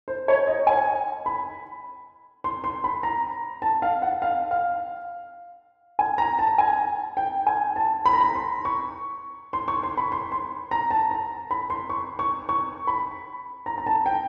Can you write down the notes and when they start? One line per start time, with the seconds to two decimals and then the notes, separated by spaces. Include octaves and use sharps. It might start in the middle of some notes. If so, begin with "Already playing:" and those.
0.08 C5
0.28 C#5
0.47 D#5
0.67 G#5
1.26 B5
2.44 C6
2.64 C6
2.84 B5
3.03 A#5
3.62 A5
3.82 F5
4.02 F#5
4.22 F5
4.51 F5
5.99 G#5
6.18 A#5
6.39 A5
6.58 G#5
7.17 G5
7.47 G#5
7.76 A5
8.06 B5
8.13 A#5
8.21 B5
8.35 C6
8.65 C#6
9.53 C6
9.68 C#6
9.83 C6
9.97 B5
10.12 C6
10.32 C6
10.71 A#5
10.91 A5
11.11 A#5
11.51 B5
11.70 C6
11.90 C#6
12.19 C#6
12.49 C#6
12.87 B5
13.66 A#5
13.78 A#5
13.87 A5
14.06 G5